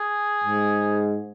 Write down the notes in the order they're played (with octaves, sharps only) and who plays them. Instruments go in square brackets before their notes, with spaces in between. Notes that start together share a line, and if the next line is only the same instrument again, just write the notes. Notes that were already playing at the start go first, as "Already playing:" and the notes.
Already playing: [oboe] G#4
[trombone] G#2